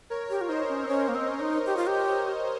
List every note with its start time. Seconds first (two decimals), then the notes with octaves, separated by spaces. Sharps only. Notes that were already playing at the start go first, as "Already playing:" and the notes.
0.10 A#4 C#5
0.30 G4
0.41 F4
0.49 D#4 C5 D#5
0.69 C#4
0.84 C4
0.88 C#4 A#4 C#5
1.08 A#3
1.15 C4
1.28 C#4
1.40 D#4
1.66 G4
1.77 F4
1.87 G4